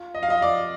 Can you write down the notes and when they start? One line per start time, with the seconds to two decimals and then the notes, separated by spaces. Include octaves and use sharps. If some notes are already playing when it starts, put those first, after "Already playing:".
Already playing: F4
0.15 D#5
0.23 F5
0.28 F4 D#5
0.42 D5